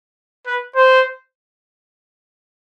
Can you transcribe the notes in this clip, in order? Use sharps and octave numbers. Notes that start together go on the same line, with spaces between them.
B4
C5